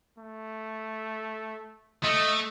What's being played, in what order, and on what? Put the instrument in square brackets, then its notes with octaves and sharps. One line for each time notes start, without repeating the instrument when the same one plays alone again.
[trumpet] A3
[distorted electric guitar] A3 [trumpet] D#5